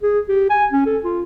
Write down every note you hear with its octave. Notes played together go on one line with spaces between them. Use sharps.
G#4
G4
G#5
C#4
A4
F4